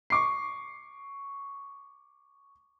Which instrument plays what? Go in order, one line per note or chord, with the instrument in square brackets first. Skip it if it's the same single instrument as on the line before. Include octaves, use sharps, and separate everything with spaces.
[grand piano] C#6 D6 C7